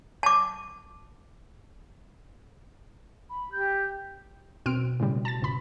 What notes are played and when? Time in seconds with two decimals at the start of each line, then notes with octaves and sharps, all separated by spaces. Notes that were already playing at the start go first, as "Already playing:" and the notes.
0.23 A5 D6
3.30 B5
3.52 G4 G6
4.66 B2 C4 F6 D7
5.00 A2 C#3 G3
5.25 A5 A6
5.40 G#1 C#2 B5